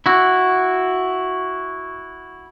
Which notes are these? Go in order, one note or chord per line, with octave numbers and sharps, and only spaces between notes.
E4 F#4